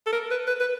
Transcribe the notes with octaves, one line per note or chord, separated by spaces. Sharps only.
A4
A#4
B4
B4
B4